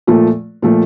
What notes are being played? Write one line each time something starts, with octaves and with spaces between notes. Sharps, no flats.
A#2 F3 A3
A#2 F3 A3